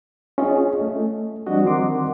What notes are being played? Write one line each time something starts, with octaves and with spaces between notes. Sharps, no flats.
C#4 F4 G#4 D#5
A3
F3 G3 C4 D4 F#4 D#5
D#3 C4 A#4 F#5 C6 D6